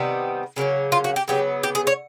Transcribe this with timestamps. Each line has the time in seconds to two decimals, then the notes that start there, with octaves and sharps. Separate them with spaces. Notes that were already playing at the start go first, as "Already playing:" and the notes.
Already playing: C3 D#3 G3 B3
0.56 C#3 F#3 A#3 C#4
0.92 F4
1.04 F#4
1.16 G4
1.28 C#3 F#3 B3 G4
1.63 G4
1.75 G#4
1.87 C#5